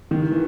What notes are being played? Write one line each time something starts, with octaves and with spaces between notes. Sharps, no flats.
D#3
E3